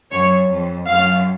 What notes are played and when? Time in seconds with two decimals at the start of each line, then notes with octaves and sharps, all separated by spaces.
0.11 F#2 C#5
0.48 F2
0.87 F#2 F5